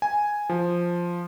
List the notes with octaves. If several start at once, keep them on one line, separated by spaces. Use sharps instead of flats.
G#5
F3